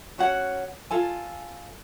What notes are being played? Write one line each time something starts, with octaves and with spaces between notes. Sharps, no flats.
C#4 F#4 C#5 F#5
F4 A4 G#5